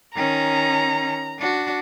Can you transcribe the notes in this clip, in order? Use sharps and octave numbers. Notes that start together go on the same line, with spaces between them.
D#3 C#4 A#5
D4 F#4